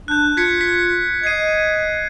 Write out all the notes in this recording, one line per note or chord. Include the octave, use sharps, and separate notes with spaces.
D4 F#6 G6
F4 G#6 B6 C#7
B6
D#5 G#6 C7 D#7